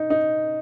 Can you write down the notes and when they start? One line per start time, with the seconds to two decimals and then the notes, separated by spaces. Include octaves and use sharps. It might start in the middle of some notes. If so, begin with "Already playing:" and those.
Already playing: D#4
0.10 D#4